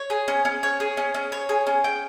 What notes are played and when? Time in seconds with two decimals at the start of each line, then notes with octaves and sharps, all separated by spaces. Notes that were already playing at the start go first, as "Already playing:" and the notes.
Already playing: C#5
0.10 G#4
0.28 C#4
0.45 C#4
0.63 C#5
0.80 G#4
0.97 C#4
1.14 C#4
1.32 C#5
1.49 G#4
1.67 C#4
1.84 G5